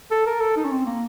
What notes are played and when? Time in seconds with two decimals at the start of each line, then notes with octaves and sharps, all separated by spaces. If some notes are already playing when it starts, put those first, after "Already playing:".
0.11 A4
0.26 A#4
0.41 A4
0.56 D#4
0.65 C#4
0.71 C4
0.86 A#3